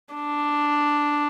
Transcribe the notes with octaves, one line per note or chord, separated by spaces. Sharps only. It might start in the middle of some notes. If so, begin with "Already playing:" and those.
D4